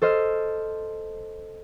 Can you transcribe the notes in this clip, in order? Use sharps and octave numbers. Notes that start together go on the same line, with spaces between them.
A4 C5 D#5 F6